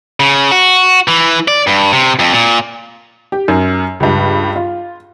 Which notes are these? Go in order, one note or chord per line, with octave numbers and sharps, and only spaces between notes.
C#3
F#4
E3
D5
G2
C3
F2
A#2
G4
F#2
C#2 G2
F4